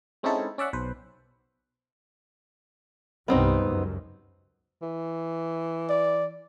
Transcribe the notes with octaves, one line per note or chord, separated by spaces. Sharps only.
G#3 C4 C#4 D#4 E4 A4
C#4 D5 E5 F#5
B1 B4 C5
C2 G2 G3 B3 C4 D#4
C#2 F#2
E3
D5